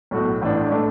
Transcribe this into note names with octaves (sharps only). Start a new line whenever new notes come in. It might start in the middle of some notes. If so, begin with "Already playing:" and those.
B1 A2 A3 F#4
A1 A2 E3 D4
A2 A3 D4